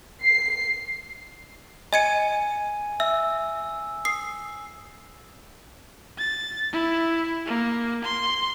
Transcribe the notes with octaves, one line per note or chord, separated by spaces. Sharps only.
C7
D#5 G#5 G#6 C#7 D#7
E5 E6
D#6 C7
A6
E4
A#3
C6